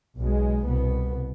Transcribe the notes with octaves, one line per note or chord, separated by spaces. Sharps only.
B1 B2 G#3
C2 B2 B3